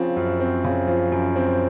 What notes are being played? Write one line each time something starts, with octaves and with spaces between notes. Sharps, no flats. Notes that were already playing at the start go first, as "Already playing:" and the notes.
Already playing: C#3 F3 C4
F#2
C4
C#3
F3
F#2
C4